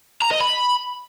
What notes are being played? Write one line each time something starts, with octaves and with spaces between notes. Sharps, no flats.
A#5
D#5
B5